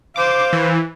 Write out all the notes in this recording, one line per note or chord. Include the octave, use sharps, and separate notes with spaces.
C5 F5 D6
E3